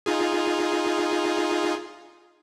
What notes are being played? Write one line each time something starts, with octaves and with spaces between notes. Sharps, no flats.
D#4 F4 G#4